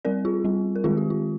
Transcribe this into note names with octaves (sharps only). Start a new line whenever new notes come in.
G3 C4 A#4 D5
F4 G#4
G3 C4
A#4
D#3 G#3 C4 F4 G#4
G4
F4